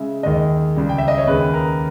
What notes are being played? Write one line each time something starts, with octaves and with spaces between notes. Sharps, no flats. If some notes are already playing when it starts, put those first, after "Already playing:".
Already playing: C#3 G#3 E5
D#2 D#3 G#3 D#5
C#2 C#3 G3
G5
E5
D#5
C#5
D#2 C#3 G#3 B4
A#4